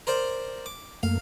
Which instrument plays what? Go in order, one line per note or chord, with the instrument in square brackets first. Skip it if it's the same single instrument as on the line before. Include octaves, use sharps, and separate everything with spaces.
[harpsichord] A#4 C5 D5
D6
[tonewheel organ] F#2 A3 A#3 [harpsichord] F5